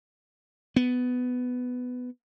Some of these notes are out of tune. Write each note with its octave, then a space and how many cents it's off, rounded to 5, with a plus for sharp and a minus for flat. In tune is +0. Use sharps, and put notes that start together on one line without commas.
B3 +10